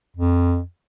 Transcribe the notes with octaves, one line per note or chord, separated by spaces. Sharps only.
F2